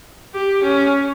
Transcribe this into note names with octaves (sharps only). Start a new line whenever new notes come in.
G4
C#4